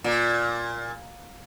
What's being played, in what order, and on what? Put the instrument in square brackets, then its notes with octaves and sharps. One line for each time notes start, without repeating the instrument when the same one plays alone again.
[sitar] A#2